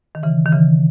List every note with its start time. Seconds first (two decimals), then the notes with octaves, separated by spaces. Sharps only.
0.15 D#3
0.23 C#3 E3
0.46 D#3
0.53 C#3 E3